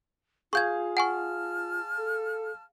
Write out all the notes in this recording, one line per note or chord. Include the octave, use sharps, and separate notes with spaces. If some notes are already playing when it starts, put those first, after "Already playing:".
F4 G#4 F5 C#6 G6 G#6
F#5 G#5 A5 C#6 F6
A4